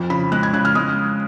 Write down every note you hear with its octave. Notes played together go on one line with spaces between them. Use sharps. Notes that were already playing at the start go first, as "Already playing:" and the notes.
Already playing: F2
C#3 B5
G#3 F#6
G#6
C#3 F#6
F6
G#3 D#6